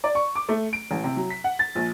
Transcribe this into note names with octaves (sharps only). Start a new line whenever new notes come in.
D5
C#6
D6
A3
D7
A1
C3
F#3
B6
F#5
A6
A#1